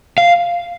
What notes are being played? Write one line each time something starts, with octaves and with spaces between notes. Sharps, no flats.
F5